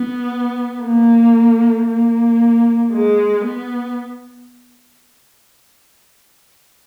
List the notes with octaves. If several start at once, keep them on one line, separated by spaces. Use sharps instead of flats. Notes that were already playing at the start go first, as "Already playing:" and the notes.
Already playing: B3
A#3
A#3
G#3
B3